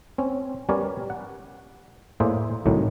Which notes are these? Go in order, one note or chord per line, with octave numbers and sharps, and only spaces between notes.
C4 C#4
G3 B3 C#4 A#4 C#5 D5
F#5
A2 A#3 G#4 C5 D5 E5
C2 A2 D#3 F#3